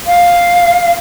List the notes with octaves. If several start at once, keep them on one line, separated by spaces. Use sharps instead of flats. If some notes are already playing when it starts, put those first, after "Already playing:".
F5